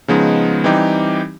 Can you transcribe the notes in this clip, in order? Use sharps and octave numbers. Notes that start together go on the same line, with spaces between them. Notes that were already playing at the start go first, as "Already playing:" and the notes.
C#3 F3 G#3 B3 D#4
E3 G3 C4 D#4 G4